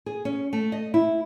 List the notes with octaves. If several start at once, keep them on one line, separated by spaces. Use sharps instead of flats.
G#4
C#4
A3
D#5
E4